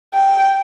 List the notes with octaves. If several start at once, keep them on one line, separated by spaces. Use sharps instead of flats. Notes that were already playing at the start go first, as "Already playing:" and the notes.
G5